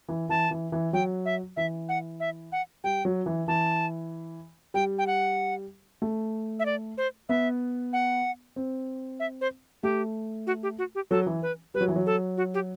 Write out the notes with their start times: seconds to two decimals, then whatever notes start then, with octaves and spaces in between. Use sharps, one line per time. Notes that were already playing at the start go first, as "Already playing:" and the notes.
0.09 E3
0.29 E3 A5
0.51 E3
0.72 E3
0.93 F#3 G5
1.25 E5
1.57 E3 E5
1.89 F#5
2.20 E5
2.52 F#5
2.84 G3 G5
3.05 F#3
3.26 E3
3.48 E3 A5
4.74 G3 G5
4.98 G5
5.07 F#5
6.02 A3
6.59 E5
6.66 D5
6.98 C5
7.29 B3 E5
7.93 F#5
8.56 C4
9.20 E5
9.41 C5
9.83 A3 G4
10.47 F#4
10.63 G4
10.78 F#4
10.95 G4
11.11 F#3 A4
11.26 E3
11.42 B4
11.74 G3 B4
11.81 F#3
11.88 E3
11.96 F#3
12.06 A4
12.37 F#4
12.54 G4